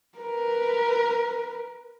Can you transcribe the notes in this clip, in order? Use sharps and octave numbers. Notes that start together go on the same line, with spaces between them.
A#4 B4